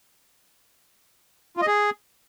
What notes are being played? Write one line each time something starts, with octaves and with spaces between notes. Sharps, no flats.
F4
D#5
G#4